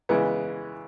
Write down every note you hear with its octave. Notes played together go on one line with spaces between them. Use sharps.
C#3 E3 G#3 B3